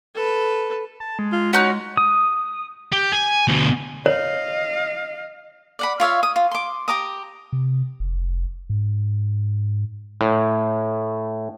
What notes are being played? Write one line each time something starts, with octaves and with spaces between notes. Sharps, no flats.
A4 B4
A5
G#3
F4
G#3 C#4 D#4 F#4 F#6
D#6
G4
G#5
D2 B2
C#5 D#5 F5
D5 F#5 B5
F4 C#5 E5 F5
D#6
F4
C6 D6
G4 A#5 D6 D#6
C3
F1
G#2
A2